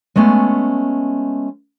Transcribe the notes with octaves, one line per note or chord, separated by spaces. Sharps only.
G#3 A3 B3 C#4